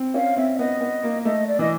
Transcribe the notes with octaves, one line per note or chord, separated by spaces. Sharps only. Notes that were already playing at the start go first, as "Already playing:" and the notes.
Already playing: C4
C#4 F5
C4 E5
B3 D#5
B3
A#3
A3 D#5
D5
E3 D#5